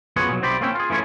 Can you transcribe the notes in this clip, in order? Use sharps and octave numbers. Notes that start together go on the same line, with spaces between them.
F#2 B3 F4 G#4 C#5 F#5
B2 F#3
B1 C3 C4 C5 D5 B5
A#3 C4 C#4 E4 G5
F4 G#4
E3 A3 C#4 F4 C#5